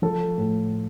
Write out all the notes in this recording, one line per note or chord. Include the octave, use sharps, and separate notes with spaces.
F3 A4
A2